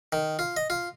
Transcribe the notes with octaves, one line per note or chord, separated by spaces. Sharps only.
D#3
F4
D#5
F4